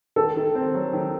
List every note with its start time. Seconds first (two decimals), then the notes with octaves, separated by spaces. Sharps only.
0.16 D#3 A4
0.36 D#3
0.55 C4
0.74 F#3
0.93 D#3